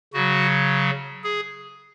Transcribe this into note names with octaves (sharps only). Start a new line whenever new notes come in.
C#3 F#3 F#4
G#4